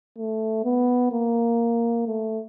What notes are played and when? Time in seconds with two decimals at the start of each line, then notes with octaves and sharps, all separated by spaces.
0.18 A3
0.65 B3
1.12 A#3
2.07 A3